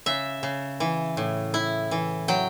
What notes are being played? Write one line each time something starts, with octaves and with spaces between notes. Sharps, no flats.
C#3 E5
C#3
E3
A2
E4
E3
F#3 G5